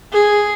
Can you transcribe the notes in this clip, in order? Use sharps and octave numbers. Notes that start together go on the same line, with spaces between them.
G#4